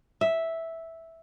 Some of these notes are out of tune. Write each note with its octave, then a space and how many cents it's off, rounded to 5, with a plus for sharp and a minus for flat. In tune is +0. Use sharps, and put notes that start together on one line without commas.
E5 -5